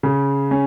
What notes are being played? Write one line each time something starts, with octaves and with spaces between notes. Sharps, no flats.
C#3
C#4